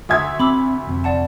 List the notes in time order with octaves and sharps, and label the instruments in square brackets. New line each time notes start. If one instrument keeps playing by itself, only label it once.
[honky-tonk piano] D2 E5 G#6 [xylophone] D#6
[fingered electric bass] C4 [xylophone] B5 D6 E6
[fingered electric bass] F1 C3
[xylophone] D5 F#5 A5